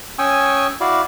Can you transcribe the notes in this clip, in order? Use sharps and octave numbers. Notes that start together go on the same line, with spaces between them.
C#4 G5 G#5 C#6 D#6 E6
E4 F#4 D5 F5